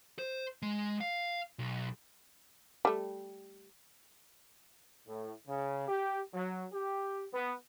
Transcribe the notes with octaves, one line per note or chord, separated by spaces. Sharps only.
C5
G#3
F5
B1
G3 A3
A2
C#3
G4
F#3
G4
B3